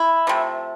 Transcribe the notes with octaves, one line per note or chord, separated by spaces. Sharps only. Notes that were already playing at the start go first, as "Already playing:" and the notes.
Already playing: E4
C3 F3 A3